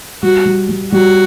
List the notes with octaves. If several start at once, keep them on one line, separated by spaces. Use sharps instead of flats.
G3 F#4
G3
G3
G3 F#4